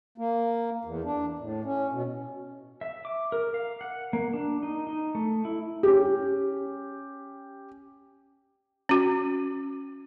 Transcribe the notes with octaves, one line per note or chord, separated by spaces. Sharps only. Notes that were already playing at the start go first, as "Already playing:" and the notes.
A#3
E2
D4
A2
C#4
B2
E5
D6
A#4
F5
F#5
A#3
D4
D#4
D#4
A3
E4
C#4 G4
C#4 F#4